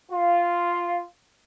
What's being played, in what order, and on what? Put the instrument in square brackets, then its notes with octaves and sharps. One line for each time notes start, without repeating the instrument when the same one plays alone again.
[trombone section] F4